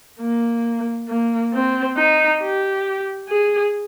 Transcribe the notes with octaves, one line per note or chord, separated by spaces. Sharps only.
A#3
A#3
C4
D#4
G4
G#4